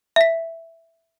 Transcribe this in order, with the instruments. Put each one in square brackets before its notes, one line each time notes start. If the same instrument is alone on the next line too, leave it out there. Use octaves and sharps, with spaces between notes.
[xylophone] E5 B6